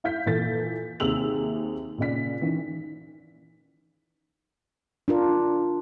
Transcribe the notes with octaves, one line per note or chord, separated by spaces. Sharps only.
E4 F5 G6 B6
A#2 E3 A4 A6 B6
D#2 C3 G#4 E6 F7 F#7
A#2 C#3 D5 B6
D#3 E3 C#4
D4 F4 A#4